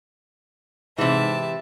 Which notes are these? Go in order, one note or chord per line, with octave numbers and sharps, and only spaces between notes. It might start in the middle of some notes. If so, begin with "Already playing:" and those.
G#2 C3 E3 E5 A5